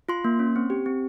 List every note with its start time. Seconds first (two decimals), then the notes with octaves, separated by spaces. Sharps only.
0.09 F4 C6
0.24 A#3
0.39 C#4
0.56 C4
0.70 G4
0.86 C4